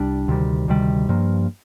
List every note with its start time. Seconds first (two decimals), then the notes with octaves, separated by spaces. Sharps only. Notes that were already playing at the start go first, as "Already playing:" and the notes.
Already playing: C2 G3 D4
0.28 D2 C3 D#3 G3
0.68 D2 C3 D#3 G3
1.09 G2 F3 A#3